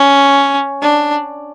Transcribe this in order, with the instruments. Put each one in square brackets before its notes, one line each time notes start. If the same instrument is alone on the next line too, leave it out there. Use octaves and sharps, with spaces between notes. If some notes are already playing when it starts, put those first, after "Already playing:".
Already playing: [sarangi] C#4
D4